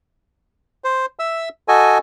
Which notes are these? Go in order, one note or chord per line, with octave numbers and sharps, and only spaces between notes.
C5
E5 E6
F#4 A4 D#5 G#5